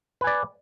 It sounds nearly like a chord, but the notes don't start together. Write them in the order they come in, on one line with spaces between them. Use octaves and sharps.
B4 G#5 D5